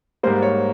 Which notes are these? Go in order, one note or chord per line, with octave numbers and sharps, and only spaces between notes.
G#2 G3 A#3 C5
C#5